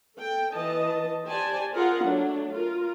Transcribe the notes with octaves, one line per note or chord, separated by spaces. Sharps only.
A4 G5
E3 D#5 A5
G4 C5 D5 G#5 A5
F4 G#4 A#4 F#5
F#3 A3 D4
F4 A#4